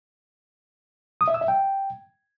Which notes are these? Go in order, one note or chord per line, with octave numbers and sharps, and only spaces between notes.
D#6
E5
E6
E5
G5